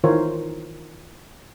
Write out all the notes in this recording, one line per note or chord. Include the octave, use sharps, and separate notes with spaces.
D#3 E3 F4 A#4 C5 C#5